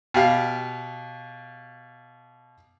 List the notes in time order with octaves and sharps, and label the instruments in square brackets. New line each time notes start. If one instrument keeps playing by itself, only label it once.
[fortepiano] B2 G4 F5